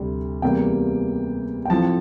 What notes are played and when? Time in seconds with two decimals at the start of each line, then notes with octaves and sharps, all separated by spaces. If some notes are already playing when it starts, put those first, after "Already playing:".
Already playing: D2 C3 G3
0.42 E2 C3 G3 A#3 G5
1.65 G5
1.70 A2 F3 C4 A5